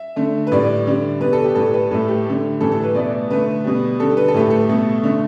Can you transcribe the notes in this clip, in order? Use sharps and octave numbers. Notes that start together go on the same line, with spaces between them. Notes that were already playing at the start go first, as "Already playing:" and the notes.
Already playing: E5
D3 A3
B4
A2 G3 D5
D3 G3
B2 G3 B4
A4
G4
A2 G3 A4
B4
A2 A3 A4
G4
D3 A3
A2 E3 G3 A4
A4
B4
B2 A3 D5
D3 A3 B4
B2 G3
D3 G3 A4
B4
A4
A2 A3 G4
A4
B2 A3
D3 A3